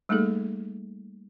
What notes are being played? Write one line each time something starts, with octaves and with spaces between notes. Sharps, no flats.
G3 A3 A#3 D#4 G#4 A4